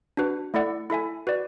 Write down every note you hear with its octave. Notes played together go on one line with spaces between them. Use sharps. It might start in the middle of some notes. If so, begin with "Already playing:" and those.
D4 F#4 B4
A3 E4 A4 D5 F#5
E4 A4 E5 G#5
F#4 B4 D5